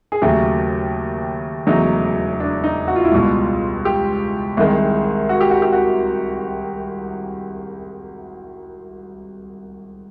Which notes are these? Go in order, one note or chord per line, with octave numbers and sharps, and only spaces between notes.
G#4
D#2 C#3 F#3 A3 G4
E1 E2 C#3 F#3 A3 D#4
D4
D#4
F#4
F4
E4
C#2 B2 G3 F4
G4
C2 C3 D#3 G#3
F#4
G4
F#4
G4
F#4